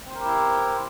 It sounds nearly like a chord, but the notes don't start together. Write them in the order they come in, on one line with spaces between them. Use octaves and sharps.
C4 C5 A#4 G4 E4